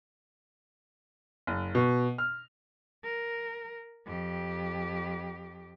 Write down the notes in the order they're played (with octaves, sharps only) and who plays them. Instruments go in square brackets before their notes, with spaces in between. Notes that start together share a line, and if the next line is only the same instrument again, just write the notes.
[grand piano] F#1
B2
F6
[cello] A#4
F2 G4